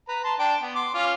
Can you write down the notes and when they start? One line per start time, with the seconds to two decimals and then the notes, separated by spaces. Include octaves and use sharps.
0.09 B4 A#5
0.24 A5 C6
0.39 D4 G5 A5
0.61 B3
0.75 C6 D6
0.94 C#4 F4 F5